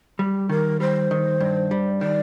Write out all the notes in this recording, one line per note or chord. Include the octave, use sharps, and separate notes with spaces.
G3 G4
D#3 A#4
G3 C5
D#3
G2
G3
D#3 D5